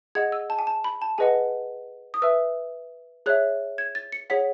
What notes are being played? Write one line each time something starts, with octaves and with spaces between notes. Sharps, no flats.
G#4 D#5 F#5 G#6
E6
A5
G#5
A5
B5
A5
G#4 B4 D#5 F#5 G#5
D#6
B4 E5 E6
G#4 C#5 E5 F#6
G#6
A6
C#7
G#4 C#5 F#5 B6